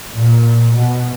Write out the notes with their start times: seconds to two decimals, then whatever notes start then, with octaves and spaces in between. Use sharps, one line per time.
0.12 A#2
0.76 B2